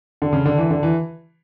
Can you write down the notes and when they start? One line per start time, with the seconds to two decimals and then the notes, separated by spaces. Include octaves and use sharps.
0.22 D3
0.33 C#3
0.45 D3
0.58 E3
0.70 D3
0.83 E3